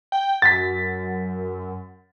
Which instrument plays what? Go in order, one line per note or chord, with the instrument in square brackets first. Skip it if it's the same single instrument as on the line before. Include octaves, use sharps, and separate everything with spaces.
[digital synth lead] G5
[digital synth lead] F#2 [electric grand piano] A6 B6